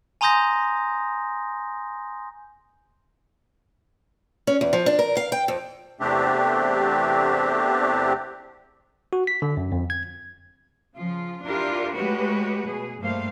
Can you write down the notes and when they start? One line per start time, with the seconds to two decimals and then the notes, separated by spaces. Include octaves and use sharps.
0.21 G#5 A#5 C6 D#6 G6 A#6
4.47 C#4
4.61 E2
4.73 F3
4.86 D4
4.99 A#4
5.17 F5
5.32 G5
5.48 F2
6.00 E2 C3 A3 C4 D4 G4
9.13 F#4
9.27 B6
9.42 D3
9.57 F#2
9.72 F2
9.90 G#6
10.95 C#3 F3 F4
11.44 D4 E4 F4 G4 A#4 D5
11.94 G#3 A3 F#4 G4 B4 C#5
12.64 B2 G#4
12.99 G2 G3 A3 A#3 C5 F5